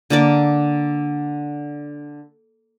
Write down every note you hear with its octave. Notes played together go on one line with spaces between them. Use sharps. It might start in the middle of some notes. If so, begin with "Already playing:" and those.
D3 A#3 D4 D5